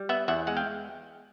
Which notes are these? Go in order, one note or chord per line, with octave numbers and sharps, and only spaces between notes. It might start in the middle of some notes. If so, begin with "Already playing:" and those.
Already playing: G3
B3 E5 F#5
E2 E5 F#5
G#3 F#5
F5 G5